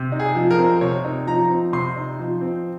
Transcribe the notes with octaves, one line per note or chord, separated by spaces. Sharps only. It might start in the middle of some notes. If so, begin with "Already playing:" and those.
Already playing: C3
D#4
G#4
F3
A#4
C4
C3 C#5
D#4
F3 A#5
C4
C3 C6
D#4
F3
C4